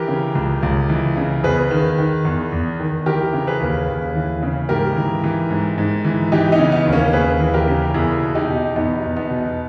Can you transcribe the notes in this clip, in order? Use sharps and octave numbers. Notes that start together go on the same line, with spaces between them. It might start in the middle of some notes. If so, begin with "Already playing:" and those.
Already playing: E3 G4 A#4
C#3
C#2
C#2
E3
C#3
E2 G#4 B4
D#3
D#3
E2
E2
D#3
E3 G4 A#4
C#3
G#4 B4
D#2
D#2
E3
C#3
G#2 G4 A#4
E3
E3
G#2
G#2
E3
E3 D#4 G4
B3 D#4
C#3
B3
D#2
A#3 C#4
D#2 G#4 B4
E3
G4 A#4
C#3
E2 E4 G#4
B2
D#4 G4
B2
E2 B3 D#4
E2
B3 D#4
B2